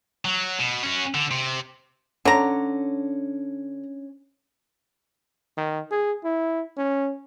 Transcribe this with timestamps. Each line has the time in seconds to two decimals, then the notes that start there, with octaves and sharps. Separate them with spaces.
0.25 F#3
0.59 B2
0.83 C#4 F#4
1.15 D3
1.31 C3
2.25 D3 C#4 D4 C#5 A#5
5.57 D#3
5.91 G#4
6.24 E4
6.77 C#4